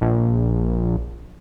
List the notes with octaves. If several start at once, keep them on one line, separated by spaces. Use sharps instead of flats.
A#1